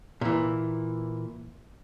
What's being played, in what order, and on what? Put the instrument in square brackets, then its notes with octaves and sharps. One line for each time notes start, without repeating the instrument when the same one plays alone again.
[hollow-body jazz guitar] A#2 E3